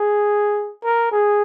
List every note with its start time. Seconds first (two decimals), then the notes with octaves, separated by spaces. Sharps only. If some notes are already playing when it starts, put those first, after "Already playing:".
Already playing: G#4
0.84 A#4
1.12 G#4